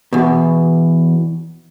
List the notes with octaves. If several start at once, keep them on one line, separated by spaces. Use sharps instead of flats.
E2 B2